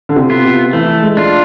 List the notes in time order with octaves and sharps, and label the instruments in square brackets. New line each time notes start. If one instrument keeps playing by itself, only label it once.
[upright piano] D3
C3
[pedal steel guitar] B3 F4
[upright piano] C3
[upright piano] E3 [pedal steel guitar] A3
[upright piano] G#3
[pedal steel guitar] D4 F4